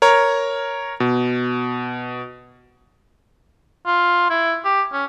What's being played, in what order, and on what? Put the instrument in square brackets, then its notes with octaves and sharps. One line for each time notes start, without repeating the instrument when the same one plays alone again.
[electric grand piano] A#4 C#5 A#5
B2
[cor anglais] F4
E4
G4
C#4